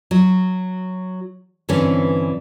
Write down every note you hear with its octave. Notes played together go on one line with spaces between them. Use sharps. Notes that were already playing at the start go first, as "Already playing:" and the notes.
F#3
G2 D3 E3 C4 C#4